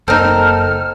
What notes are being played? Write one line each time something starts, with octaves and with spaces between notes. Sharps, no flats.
F#1 A#3 C4 D#4 A4 F6